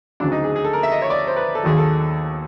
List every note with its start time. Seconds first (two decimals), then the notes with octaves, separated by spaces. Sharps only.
0.20 D2 C#3 F#3 D4
0.32 D#4
0.44 G#4
0.56 G#4
0.64 A4
0.73 A#4
0.83 E5
0.92 D#5
1.02 C#5
1.10 D5
1.27 C5
1.36 B4
1.55 A4
1.63 D#2 D#3 F#3 G#4
1.78 A4